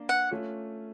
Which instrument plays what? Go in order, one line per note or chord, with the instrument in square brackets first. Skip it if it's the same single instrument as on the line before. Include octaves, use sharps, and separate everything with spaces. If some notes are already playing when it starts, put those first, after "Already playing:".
Already playing: [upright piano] A#3 D4
[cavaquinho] F#5
[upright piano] A3 C#4 F4